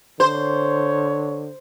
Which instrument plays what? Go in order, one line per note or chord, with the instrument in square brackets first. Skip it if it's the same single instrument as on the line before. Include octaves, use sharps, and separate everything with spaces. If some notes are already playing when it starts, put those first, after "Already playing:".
[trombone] D3 [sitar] C5 [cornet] C#5